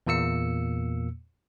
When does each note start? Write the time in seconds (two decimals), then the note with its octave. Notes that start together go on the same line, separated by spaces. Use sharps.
0.07 E2 A#2 A#3 E6 C#7